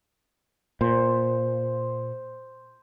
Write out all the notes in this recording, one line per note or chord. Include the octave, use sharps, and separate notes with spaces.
A#2 C5